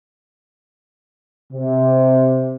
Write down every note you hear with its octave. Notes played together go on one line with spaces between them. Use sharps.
C3